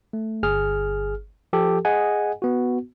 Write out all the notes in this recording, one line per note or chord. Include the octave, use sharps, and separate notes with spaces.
A3
G1 G#4 F6
F3 G4 A4
G#4 D#5 F#5 G#5
B3 F#4